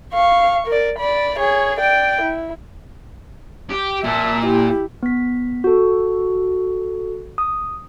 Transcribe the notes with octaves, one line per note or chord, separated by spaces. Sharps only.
F5 C#6
A#4 D5
D5 B5
G#4 C#5
D5 G5
E4
G4
A#2 E5 A5
E4 G4
B3 B6
F#4 A4
D#6